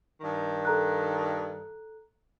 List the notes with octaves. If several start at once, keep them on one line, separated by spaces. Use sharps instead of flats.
G2 D#3
A4 A#5 F#6